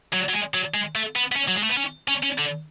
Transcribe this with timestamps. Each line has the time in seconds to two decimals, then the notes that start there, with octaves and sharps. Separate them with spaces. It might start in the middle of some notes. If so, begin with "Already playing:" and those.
0.13 F#3
0.29 F#3
0.33 G#3
0.54 F#3
0.74 G#3
0.95 A3
1.16 B3
1.32 B3
1.36 C#4
1.48 F#3
1.55 G#3
1.63 A3
1.69 B3
1.77 C#4
2.08 C#4
2.23 C#4
2.38 D3